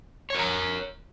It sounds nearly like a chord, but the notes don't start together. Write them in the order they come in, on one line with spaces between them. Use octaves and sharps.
C#5 A#4 A#5